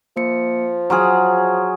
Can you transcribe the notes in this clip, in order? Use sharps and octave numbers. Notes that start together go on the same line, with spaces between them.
F3 A#3 C#7
F#3 G#4 A#5 C6 F6